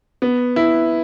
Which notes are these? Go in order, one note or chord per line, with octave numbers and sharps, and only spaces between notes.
B3
E4